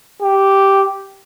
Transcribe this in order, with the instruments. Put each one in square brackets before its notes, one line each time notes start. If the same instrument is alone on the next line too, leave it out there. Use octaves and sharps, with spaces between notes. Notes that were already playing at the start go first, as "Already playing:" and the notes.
[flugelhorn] G4